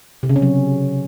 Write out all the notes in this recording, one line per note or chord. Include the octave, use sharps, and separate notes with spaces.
C3
C#3
C#4
F#3